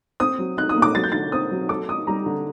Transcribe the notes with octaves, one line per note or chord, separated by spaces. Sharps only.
C4 D#6
F#3
D#4 F#6
D#6
A#3
D6
F#3 A6
G6
D3 A6
C4 D#6
F#3
A4 D6
D#4 D#6
G3 A#5
D3